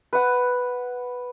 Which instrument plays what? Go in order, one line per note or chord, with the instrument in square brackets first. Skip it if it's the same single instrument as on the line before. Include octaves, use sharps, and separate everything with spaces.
[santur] B4 F#5